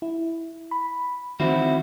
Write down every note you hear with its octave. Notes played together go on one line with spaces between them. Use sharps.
E4
B5
D#3 E3 C4 E4 F#4